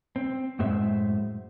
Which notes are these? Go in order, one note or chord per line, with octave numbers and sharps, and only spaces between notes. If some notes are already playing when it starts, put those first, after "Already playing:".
C4
F#2 A2 G#3 C5 E5